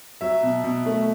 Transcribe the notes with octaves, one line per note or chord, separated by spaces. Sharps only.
F#3 E5
B2
B2
A3